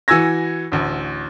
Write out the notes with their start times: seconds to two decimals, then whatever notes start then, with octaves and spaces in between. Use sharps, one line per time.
0.08 E3 F#4 G#5 E6 G#6 A#6
0.72 A1 D2